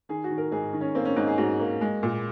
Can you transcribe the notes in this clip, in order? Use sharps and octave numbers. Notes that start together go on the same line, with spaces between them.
D#3 G#4
F#4
D#3
A#4
G#2 G#4
D#3
C#4
A#3 C4
C#4
G#2 D#4
G#4
G#2 F#4
A#3
G#3
A#2